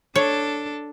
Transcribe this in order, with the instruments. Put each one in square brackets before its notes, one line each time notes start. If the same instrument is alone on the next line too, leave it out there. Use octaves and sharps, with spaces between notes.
[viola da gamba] D4 A4 [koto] C#5